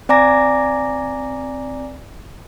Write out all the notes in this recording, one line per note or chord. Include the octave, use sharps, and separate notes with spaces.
C4 D5 G#5 A#5 D6 A#6